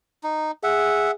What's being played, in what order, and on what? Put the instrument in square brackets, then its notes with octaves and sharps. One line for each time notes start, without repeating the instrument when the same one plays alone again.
[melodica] D#4
[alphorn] G#4 [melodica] E5 F#5